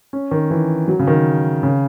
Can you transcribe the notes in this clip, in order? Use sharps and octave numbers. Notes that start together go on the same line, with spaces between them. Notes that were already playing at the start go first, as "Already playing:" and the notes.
C#4
D#3
E3
F#3
C#3
D#3
C#3